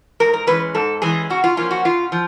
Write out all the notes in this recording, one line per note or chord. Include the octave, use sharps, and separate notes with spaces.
G#2 A#4
A#4
E3 G#3 C#4 B4
G#2 A4
E3 G#3 C#4 G#4
C#3 F#4
F4
F3 A#3 C#4 F4
F#4
C#3 F4
F3